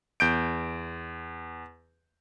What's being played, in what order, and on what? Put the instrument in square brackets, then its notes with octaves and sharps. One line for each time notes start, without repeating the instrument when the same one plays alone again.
[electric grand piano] E2 G6 D7